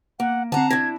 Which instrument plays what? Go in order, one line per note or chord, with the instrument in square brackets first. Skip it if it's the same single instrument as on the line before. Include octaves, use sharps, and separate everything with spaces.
[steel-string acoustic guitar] A#3 [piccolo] F#5
[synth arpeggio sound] D3 C4 [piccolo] F#5 [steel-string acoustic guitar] A5 A#5
[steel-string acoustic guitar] D4 E4 [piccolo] G#6 [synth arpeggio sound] A#6